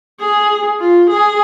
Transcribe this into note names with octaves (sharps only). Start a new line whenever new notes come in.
G#4
F4
G#4